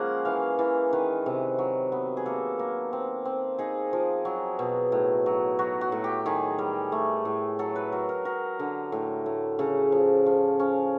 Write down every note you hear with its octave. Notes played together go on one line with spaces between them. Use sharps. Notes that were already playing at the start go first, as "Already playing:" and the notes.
Already playing: F3 G#3 A#3 C#4 F#5
E3 F5
E3
D#3 B4
C3
F#3
B3
G#4
A#3 A4
A#3
C4
C4
D#4 G#4
F3
F#3
B2
A2
F#3
F#3 F#4
F#4
A2
G4
D#3 G#4
G3
A3
A2
F#3 A4
B4
F#3 A#4
A#4
F#3 A#4
D3
A2
A2
C#3 A4
F3
F3
C#4